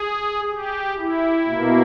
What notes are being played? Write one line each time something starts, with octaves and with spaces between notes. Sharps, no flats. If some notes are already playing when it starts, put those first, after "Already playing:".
Already playing: G#4
G4
E4
B2 A#3